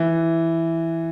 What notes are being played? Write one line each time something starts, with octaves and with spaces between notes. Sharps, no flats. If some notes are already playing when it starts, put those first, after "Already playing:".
Already playing: E3